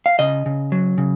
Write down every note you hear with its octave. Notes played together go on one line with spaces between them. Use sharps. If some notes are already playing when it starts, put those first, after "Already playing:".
F5
C#3 D#5
C#3
F#3
C#3